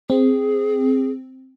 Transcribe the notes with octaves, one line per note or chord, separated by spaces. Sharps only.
C4 G#4